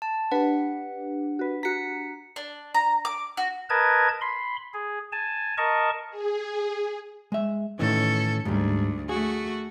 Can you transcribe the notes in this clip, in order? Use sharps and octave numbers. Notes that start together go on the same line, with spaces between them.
A5
D4 G4 B4 F#5
F#4 B4
F#4 A#5 B6 C#7
D4
A#5
D6
F#4
A#4 B4 D#5 A5 G#6
B5 C6
G#4
G#5 A5
A#4 D#5 A5 C#6
G#4
G#3 E5
A2 D#3 E3 C#4 A4
D2 G#2 G3
A3 F#4 G#4